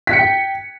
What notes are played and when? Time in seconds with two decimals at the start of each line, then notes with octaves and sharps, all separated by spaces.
0.07 B6
0.13 C#7
0.19 G5